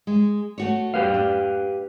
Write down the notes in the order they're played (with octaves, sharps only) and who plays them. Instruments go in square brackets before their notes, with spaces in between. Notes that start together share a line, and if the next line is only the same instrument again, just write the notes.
[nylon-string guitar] G#3
A3 F#4 C#5
[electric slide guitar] G4 B4 F5
[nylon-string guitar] D4